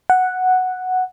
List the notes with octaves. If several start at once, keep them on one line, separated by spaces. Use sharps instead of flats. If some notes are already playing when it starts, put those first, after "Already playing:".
F#5